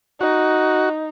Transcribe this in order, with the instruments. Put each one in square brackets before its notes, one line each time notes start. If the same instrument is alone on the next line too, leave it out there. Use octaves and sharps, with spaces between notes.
[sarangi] D#4 [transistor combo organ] F#4